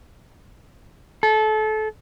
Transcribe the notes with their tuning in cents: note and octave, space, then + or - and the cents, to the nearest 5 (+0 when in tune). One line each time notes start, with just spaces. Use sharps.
A4 -25